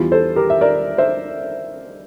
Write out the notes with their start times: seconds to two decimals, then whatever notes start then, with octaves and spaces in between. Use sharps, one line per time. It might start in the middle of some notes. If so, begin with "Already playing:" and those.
Already playing: E2 E3 G3 F4
0.12 A4 C5
0.36 G4 A#4
0.50 E5
0.61 A#4 D5
0.98 C5 E5